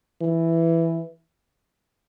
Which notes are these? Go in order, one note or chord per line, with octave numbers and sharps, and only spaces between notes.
E3